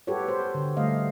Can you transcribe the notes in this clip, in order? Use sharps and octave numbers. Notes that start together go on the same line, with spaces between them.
F#4 G4 A4 B4 C#5
C5
D3
D3 G3 A3 D#5 F5